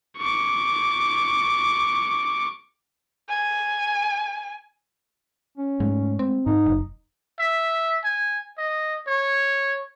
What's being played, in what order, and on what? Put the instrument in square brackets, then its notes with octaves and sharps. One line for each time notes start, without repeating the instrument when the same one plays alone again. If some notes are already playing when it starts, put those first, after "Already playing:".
[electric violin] C#6 D6
[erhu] G#5
[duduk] C#4
[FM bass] G#2 [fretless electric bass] G#3 A3
[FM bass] C4
[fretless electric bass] G#2 [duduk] D#4
[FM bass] F#1
[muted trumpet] E5
G#5
D#5
C#5